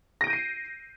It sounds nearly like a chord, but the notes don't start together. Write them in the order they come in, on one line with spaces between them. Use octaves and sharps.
A#6 D7 G6 D#7 C7